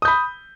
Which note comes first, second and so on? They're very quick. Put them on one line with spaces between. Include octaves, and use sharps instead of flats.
D#6 G6 B5